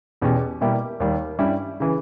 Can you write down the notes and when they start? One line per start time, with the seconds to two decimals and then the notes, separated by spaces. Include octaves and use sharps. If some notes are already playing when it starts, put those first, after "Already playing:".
0.22 E2 B2 G#3 C#4 G4
0.61 B2 G3 A#3 E4 G4
1.00 D#2 D#3 G3 A#3
1.39 G2 G3 C#4 E4
1.80 C#3 E3